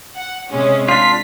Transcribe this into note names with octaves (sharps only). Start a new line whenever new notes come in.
F#5
C3 G#3 C#4
D4 F4 B6